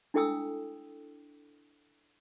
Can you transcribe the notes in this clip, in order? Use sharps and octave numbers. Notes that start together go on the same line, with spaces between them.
D4 E4 A4 G5 D#6 E6